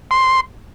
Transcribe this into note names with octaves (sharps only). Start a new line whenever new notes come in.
C6